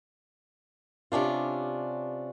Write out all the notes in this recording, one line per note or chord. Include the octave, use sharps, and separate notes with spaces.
C3 C#4 D4 F4